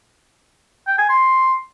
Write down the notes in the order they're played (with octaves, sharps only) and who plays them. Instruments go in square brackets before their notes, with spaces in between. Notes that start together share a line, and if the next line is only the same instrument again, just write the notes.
[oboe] G5
G#5
C6